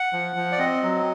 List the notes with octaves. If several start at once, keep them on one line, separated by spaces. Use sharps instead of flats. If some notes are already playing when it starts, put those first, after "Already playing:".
Already playing: F#5
F3
F3
D5
C4 D#5
F#3